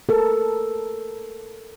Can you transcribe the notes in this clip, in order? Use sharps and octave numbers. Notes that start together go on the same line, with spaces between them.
A4 A#4